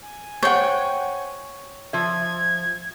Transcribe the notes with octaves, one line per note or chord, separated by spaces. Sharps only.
G#5
C5 C#5 F#5 G5
F3 E5 G#6